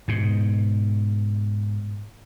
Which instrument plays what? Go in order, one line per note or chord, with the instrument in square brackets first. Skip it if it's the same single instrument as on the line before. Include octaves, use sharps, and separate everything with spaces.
[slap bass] G#2 B2